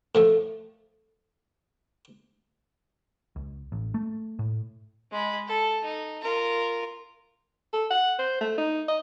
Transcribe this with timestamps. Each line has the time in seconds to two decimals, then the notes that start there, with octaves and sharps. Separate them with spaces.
0.15 A2 F3 A3
3.36 C#2
3.72 A1
3.94 A3
4.39 A2
5.12 G#3 B5
5.48 A4
5.84 D#4
6.22 F4 A#4
7.73 A4
7.90 F#5
8.19 C5
8.41 A3
8.58 D#4
8.88 D#5